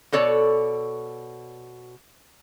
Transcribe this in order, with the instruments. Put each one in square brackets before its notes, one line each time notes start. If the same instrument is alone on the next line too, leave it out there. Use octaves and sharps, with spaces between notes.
[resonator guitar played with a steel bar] B2 A4 C#5 D5